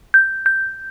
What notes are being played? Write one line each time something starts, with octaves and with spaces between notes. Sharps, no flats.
G6
G6